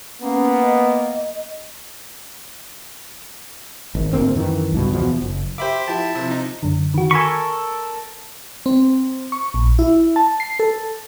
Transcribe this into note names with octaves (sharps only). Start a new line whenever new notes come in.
A#3 B3 C#4
D#5
G#1
D2 G#2 A#3 C4
F#2 D#3 E3
C#2 G2 B2
E2 B2 F3
F#1
G4 C5 E5 B5 D6
F3 E4 G4 A5
C3 F3
D#4
F#2 D3
D#3 F#4
A4 A#4 G#5 B5 C#6
C4
C#6
A#1
E4
A5
C7
A4